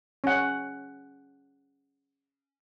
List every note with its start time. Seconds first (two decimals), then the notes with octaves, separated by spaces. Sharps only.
0.24 C#4 F#5